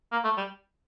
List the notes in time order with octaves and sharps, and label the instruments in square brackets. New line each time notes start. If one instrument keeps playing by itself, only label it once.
[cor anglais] A#3
A3
G3